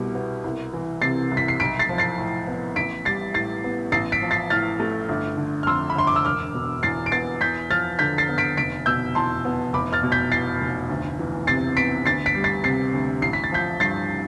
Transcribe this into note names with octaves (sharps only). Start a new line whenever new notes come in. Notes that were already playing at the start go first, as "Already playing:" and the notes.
Already playing: C2 B2 G3
B3
C2
E3
C3 A6 C7
C2
B6
C7
B1 B6 D7
A6 C7
F3
A6 C7
A2
B3
A1 B6 D7
G3 A6 C7
A2 A6 C7
B3
A1 A6 C7
B6 D7
F3
A6 C7
A2 F6 A6
A3
G1
D3
F6
F2 C6 E6
B5
G1 C6
D6
E6
E1 D6 F6
B2
E2 A6 C7
D7
B3 A6 C7
E2 G6 B6
F3 F6 A6
D3 G6 B6
A6 C7
B3
B6 D7
F1 B6 D7
B2 E6 G6
E2 A5 C6
B3
F1 B5 D6
F6 A6
B2
G6 B6
E2 A6 C7
F1
D2
E3
C3 A6 C7
B3 B6 D7
D2 A6 C7
B6 D7
G3
A6 C7
C3 A6 C7
D2
A1 C7
B6
A6
F3 G6 B6
G2 A6 C7